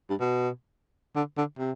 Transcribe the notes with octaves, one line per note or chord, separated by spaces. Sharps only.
G2
B2
D3
D3
C3